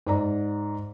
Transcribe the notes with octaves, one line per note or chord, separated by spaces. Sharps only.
G#2 D5 A#5